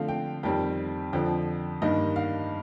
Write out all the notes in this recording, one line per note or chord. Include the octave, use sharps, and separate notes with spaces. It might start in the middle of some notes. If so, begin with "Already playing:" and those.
Already playing: D3 F3 A3 C4 F5
G5
F2 D#3 G3 C4 G5
F2 D3 F3 G5
G2 D#3 G3 A#3 D#5
F5